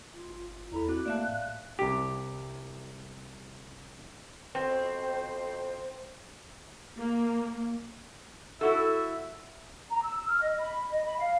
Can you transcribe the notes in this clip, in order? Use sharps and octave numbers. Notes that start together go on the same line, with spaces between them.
F4
G1
E2 E4 A4 A#5 B5
C4 F#4 D6 F#6
A3 A#3 D5 E5 F5 A5
A2
C2 G4
F2 B2 C4 C5
A#3
E4 F#4 A4 E5
A#5
E6
F6
D#5
B5
D#5
B5
F5